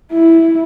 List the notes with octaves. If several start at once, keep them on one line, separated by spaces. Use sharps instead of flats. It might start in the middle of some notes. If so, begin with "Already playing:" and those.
E4